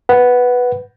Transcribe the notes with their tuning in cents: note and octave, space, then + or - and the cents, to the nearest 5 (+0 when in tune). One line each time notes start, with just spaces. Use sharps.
B4 +0 F#5 +0